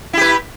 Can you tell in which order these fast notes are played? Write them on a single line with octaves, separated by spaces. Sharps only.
E4 G4 B4